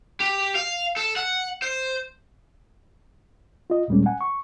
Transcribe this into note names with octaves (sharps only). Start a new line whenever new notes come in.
G4
F5
A4
F#5
C5
F4 D#5
D#2 A#2 G3 G#3 A#3 C#4
F#5 G#5
C#6